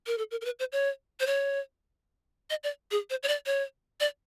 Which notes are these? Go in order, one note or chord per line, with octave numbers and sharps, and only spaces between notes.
A#4
A4
A#4
A#4
B4
C5
C#5
C5
C#5
D#5
D5
G#4
C5
C#5
D5
C#5
D5